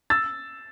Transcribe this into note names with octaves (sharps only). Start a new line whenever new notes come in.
E6 A6